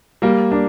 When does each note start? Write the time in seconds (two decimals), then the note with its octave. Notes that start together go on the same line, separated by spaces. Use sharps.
0.22 G3 A#3
0.52 A#3 D4